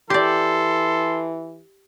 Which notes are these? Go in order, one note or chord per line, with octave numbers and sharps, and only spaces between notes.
E3 G4 A4 D5 C6